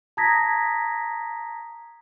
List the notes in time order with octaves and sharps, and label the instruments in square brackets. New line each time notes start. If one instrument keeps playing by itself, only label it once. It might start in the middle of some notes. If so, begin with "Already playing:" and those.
[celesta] A5 A#5 D#6 G#6 A#6 B6